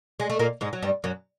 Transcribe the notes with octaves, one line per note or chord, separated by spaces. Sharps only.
G#3
A3
A#2 A#3
G#2 G#3
F#3
G2 G3
F#2 F#3